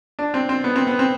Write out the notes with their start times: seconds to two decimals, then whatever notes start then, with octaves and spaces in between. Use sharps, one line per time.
0.19 D4
0.34 C4
0.49 C4
0.64 B3
0.76 C4
0.87 B3
0.99 C4